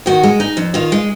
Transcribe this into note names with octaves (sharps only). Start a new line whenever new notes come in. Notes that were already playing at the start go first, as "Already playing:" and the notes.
D#3 F#4
G#3
D#4
F2
D#3 F4
G#3